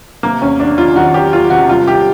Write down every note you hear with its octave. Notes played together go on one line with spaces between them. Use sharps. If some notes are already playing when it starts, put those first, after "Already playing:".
C3 A#3
E2 C#4
E2 D4
D#3 F4
D#3 F#4
E2 G4
E2 F4
C3 F#4
C2 F4
C3 G4